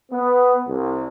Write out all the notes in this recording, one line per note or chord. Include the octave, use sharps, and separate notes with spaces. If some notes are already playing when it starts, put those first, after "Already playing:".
B3
C2